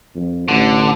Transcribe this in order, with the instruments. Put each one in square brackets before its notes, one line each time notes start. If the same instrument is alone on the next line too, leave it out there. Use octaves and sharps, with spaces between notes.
[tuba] F2
[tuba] A1 [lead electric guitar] D3